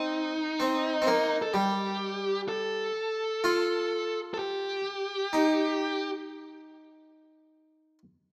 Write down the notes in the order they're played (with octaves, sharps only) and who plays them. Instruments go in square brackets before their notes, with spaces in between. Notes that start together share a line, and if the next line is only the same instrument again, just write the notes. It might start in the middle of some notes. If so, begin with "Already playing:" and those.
Already playing: [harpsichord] C4 [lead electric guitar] D#4
[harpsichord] C4
C4
A#3
[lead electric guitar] A4
[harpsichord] G3 [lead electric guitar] G4
[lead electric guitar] A4
[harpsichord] F4
[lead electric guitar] A4
G4
[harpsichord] D#4